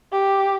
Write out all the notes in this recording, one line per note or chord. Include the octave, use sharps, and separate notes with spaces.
G4